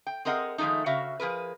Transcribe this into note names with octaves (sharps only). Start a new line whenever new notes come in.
G5
C4 G#4 A#4 D#5 F#5
D#3 F3 G#3 A3 D#4
C#3 F#4 E5 F5
F3 G#4 A#4 B4